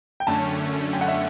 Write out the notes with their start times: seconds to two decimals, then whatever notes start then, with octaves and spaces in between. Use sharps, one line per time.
0.20 G5
0.27 F#2 D3 A3 C#4 A5
0.93 G5
1.01 F#5
1.08 E5